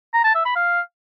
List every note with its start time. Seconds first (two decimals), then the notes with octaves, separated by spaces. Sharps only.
0.14 A#5
0.24 A5
0.35 E5
0.45 B5
0.56 F5